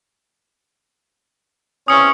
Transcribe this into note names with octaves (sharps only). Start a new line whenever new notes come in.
E2 C4 C#4 D#6 C#7